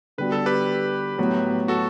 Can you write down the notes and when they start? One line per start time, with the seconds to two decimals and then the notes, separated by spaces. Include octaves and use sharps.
0.18 D3 G3 B3 F#4 B4
0.32 A4
0.46 G4 B4
1.18 A2 F#3 B3 F#4
1.68 F#4 A4